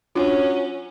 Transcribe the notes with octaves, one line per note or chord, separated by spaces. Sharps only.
F#3 C#4 D4 F4